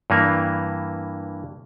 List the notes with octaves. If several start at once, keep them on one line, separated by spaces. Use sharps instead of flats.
G2 E3 A#3